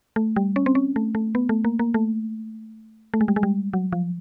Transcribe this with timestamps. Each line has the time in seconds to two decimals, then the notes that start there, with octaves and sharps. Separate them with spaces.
0.16 A3
0.36 G3
0.56 C#4
0.66 C4
0.75 C#4
0.96 A3
1.15 A3
1.35 B3
1.49 A3
1.65 A#3
1.79 A#3
1.94 A3
3.14 A3
3.21 G#3
3.28 G3
3.36 G#3
3.43 G3
3.73 F#3
3.92 F3